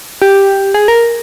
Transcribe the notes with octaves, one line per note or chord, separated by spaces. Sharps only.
G4
G#4
A#4